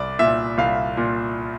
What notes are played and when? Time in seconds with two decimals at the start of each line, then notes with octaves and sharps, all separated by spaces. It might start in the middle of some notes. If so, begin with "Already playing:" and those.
Already playing: C2 D5
0.19 A#2 E5
0.58 C2 F5
0.97 A#2